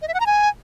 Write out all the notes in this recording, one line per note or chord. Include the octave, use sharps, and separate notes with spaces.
D#5
E5
F#5
A#5
G#5